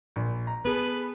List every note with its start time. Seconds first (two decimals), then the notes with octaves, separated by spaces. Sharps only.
0.16 A#1
0.47 A#5
0.65 B3 G#4 A4 B4